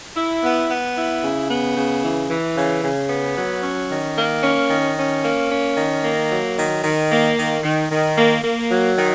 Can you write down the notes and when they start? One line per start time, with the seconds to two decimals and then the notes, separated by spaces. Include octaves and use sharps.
0.17 E4
0.43 B3
0.69 B3
0.96 E4
1.23 C#3
1.50 B3
1.76 C#3
2.03 E3
2.30 E3
2.57 C#3
2.83 C#3
3.10 B3
3.37 F#3
3.63 C#4
3.90 D#3
4.16 A#3
4.43 C#4
4.70 D#3
4.97 C#4
5.23 A#3
5.50 C#4
5.77 D#3
6.03 A#3
6.30 F#3
6.57 D#3
6.84 D#3
7.10 A#3
7.37 D#3
7.63 D#3
7.90 D#3
8.17 A#3
8.44 A#3
8.71 F#3
8.97 D#3